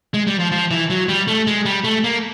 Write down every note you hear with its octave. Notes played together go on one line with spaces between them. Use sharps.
G#3
G3
F3
F3
E3
F#3
G3
A3
G#3
G3
A3
A#3